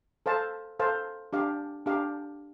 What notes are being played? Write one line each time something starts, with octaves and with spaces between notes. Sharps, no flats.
A4 C5 F5 A5
A4 C5 F5 A5
D4 G4 F5
D4 G4 F5